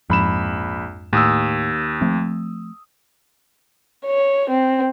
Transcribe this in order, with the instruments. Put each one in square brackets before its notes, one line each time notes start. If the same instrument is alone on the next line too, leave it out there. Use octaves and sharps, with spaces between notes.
[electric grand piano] A#1 B5 E7 [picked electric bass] F2 G#2
[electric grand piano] D#2 D#6 E6 [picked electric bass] A2
[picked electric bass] F3 A3 C4
[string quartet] C#5
C4